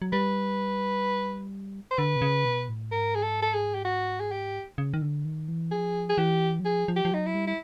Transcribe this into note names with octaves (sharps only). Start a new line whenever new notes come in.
F#3
G3 B4
C5
D3 B4
C3
C#3
B2
A2
G#2 A#4
G#4
A4
A4
G#4
G4
F#4
G#4
G4
C#3
D#3
D3
D#3
E3
F3 G#4
G#4
E3 G4
F#3
F3 G#4
F3
G4
F3
F#3 D#4
E4
G3
E4